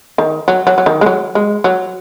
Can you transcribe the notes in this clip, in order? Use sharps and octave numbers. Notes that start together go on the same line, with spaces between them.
D#3
F#3
F#3
F#3
D#3
G#3
F#3
G#3
F#3